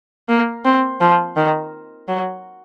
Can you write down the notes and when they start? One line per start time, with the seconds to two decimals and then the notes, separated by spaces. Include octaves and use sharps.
0.29 A#3
0.65 C4
1.01 F3
1.37 D#3
2.08 F#3